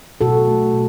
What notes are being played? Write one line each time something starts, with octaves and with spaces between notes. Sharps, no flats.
B2 F#4 A4
A3
B2